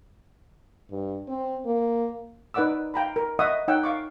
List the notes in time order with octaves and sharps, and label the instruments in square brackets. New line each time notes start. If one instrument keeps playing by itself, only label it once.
[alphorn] G2
C4
A#3
[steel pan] D#4 B4 D5 F#5 D6 E6
F5 G5 A#5 B5
A#4
D#5 E5 F#5 C#6 D#6
D#4 C#5 F#5 G5 E6
F5 C#6 D6